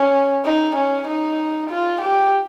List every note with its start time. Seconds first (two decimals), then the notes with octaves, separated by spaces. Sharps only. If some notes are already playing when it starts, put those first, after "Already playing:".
Already playing: C#4
0.45 D#4
0.76 C#4
1.07 D#4
1.70 F4
2.01 G4